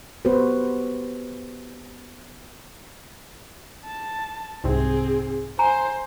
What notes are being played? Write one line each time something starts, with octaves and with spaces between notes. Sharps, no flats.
B3 F#4 G4 B4 C5
A5
C2 G#2 C3 C4 G#4
C5 G#5 A#5